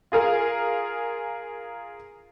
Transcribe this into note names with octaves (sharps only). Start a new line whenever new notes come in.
F4 G#4 A#4 F5